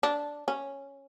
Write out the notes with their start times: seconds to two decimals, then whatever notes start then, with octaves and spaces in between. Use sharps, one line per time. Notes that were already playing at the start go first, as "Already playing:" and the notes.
0.03 D4
0.48 C#4